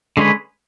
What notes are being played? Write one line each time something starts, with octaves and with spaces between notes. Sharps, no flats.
D3 G#3 C#4 G#4 B4